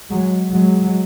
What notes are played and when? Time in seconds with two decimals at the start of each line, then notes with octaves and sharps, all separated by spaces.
0.10 F#3 G#3
0.51 F#3 G#3